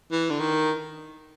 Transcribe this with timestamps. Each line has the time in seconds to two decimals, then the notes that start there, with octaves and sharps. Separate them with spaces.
0.12 E3
0.30 D3
0.40 D#3